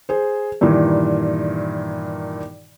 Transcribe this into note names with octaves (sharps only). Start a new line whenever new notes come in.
G#4 C5
G2 A#2 D#3 E3